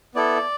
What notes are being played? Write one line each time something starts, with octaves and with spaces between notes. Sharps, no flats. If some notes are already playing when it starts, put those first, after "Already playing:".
B3 E4 A4 D5